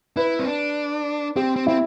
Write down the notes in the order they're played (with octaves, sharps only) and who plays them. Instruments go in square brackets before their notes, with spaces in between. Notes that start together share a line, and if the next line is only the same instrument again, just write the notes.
[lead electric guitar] E4 [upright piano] B4
[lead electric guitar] C4
D4
[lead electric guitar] C4 [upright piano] G4
[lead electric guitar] C4
[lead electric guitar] C4 [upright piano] E4